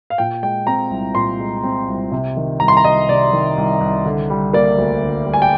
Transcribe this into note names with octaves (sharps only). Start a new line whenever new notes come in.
F5
A#2 G5
G#3 G5
C4 A#5
C2
A#2 C6
G#3
C4
C2
C3
D#3
C2 A#5
C6
A#5
C2 D#5
C3 D5
D#3
C2
C2
D3
G3
A#3 D5
D2
D3
G3
G#5
G5